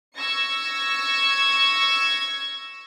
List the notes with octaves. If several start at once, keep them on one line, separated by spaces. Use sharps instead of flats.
C#6 E6 G#6 A#6 C#7